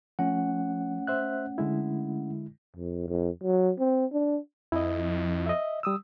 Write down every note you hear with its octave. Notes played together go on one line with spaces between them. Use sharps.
F3 A3 C#4 F#5
C5 E5 F#6
D3 G#3 E4
F2
F2
F#3
C4
D4
F2 E4 D#5
D#5 E5
G3 D#6 E6